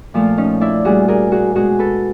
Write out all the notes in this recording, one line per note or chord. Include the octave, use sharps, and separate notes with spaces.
A#2 F3 A3
C#4 D#4
D4 E4
A#2 G3 F#4 G#4
G#4 A#4
F#4 G#4
B2 G#3 F#4 G#4
A4 B4